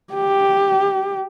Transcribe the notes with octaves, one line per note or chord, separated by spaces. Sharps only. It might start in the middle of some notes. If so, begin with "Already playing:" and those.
G4